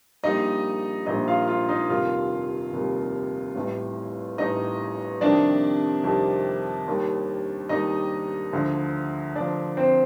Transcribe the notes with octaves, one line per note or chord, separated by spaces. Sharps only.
A#1 A#2 G3 D#4 D#5
A#1 A#2 G3 D#4 D#5
F4 F5
F4 F5
D#4 D#5
F1 D#2 D#3 G3 F4 F5
F1 D#2 D#3 G3
A1 A2 G3
A1 A2 G3 D#4 D#5
F2 C3 D#3 G3 D4 D5
F2 C3 D#3 G3
D#2 D#3 G3
D#2 D#3 G3 D#4 D#5
D2 D3 F3
D2 D3 F3 D4 D5
C4 C5